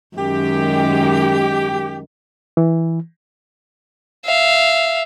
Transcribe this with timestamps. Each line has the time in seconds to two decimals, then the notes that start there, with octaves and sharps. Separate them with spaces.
0.17 F#2 D#3 G#3 G4
2.57 E3
4.25 E5 F5